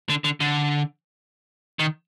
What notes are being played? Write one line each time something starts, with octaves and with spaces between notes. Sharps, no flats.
D3
D3
D3
D#3